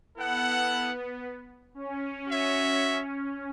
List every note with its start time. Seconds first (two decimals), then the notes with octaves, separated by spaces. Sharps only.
0.16 B3 E4 A4 F#5
1.74 C#4
2.28 F#4 C#5 E5